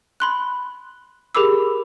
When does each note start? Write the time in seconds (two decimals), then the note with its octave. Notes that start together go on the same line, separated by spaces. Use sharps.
0.20 B5 C6 F#6
1.35 G4 G#4 A#4 B5 D6 E6